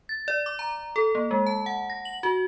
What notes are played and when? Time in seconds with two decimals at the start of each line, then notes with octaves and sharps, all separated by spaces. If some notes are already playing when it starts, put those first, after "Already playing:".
0.09 A6
0.28 D5
0.46 D6
0.59 A#5
0.96 A4
1.15 A#3
1.31 G#3
1.47 A5
1.66 F#5
1.90 A#6
2.05 F#7
2.23 F#4